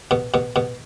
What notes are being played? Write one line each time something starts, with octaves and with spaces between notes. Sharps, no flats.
B2
B2
B2